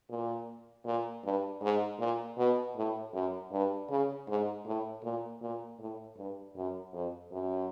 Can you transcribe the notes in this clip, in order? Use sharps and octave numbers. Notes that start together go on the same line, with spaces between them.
A#2
A#2
G2
G#2
A#2
B2
A2
F#2
G2
C#3
G#2
A2
A#2
A#2
A2
G2
F#2
F2
F#2